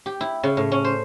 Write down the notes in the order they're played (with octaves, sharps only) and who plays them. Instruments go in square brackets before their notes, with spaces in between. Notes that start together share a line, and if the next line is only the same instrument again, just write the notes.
[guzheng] G4
E4
C#3
A2
C#4
C5